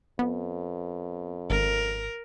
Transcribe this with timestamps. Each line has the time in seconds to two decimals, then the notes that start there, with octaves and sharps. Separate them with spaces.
0.19 F2 B3
1.50 G#1 A#4